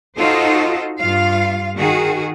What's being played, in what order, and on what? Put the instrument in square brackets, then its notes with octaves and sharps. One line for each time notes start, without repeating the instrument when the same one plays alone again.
[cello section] D#4 F4 F#4 A4 C5 D#5
G2 F4 F5
D#3 F#4 G#4